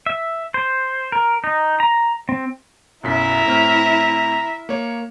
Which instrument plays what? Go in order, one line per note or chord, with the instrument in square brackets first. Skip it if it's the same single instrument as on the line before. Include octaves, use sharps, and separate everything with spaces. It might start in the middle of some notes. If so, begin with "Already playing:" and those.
[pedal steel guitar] E5
C5
A#4
D#4
A#5
C4
[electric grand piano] B1 F#2 B6 [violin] E4 E5 [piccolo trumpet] A#5
[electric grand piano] A2 C4 F6
A#3 C#5